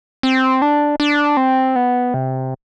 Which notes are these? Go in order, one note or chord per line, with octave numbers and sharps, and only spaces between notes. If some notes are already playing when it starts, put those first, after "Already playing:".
C4
D4
D4
C4
B3
C3